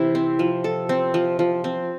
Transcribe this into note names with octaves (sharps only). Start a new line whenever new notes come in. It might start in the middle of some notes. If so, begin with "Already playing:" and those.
Already playing: C3 E3 E4
C4
F3
A4
C4
F3
F3
C4